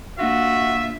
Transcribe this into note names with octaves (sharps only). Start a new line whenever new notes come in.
A#3 D4 F4 F#4 E5 A#6